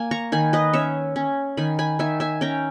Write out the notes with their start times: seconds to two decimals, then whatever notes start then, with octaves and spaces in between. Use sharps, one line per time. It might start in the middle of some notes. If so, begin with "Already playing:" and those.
Already playing: A#3 G#5
0.11 A#5 C#6
0.32 D#3 G#5 B5
0.53 B4 D#5
0.73 C#4 C#5 E5
1.16 C#4
1.57 D#3 G#5 B5
1.79 G#5 B5
1.99 D#3 E5 G#5
2.20 E5 G#5
2.41 C#4 G5 A#5